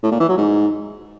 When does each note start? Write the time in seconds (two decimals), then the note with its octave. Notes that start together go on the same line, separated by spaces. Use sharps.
0.03 A2
0.11 A#2
0.20 E3
0.29 F#3
0.37 G#2